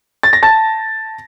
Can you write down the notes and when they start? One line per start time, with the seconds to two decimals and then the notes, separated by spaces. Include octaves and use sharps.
0.23 A6
0.33 A#6
0.43 A5 A6